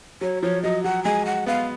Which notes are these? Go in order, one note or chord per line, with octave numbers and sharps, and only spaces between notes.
F#3 C#5
F3 C#5
F#3 D#5
F#3 F#5
G#3 G#5
F#5
B3 F5